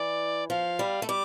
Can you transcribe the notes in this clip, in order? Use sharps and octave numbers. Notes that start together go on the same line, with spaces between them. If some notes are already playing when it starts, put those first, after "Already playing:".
Already playing: E3 D5
F3 F5
G3
A3
G3 D6